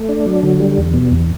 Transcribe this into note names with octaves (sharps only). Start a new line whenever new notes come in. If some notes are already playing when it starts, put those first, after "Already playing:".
Already playing: A3
D4
F#3
D3
G3
E2
B2
E2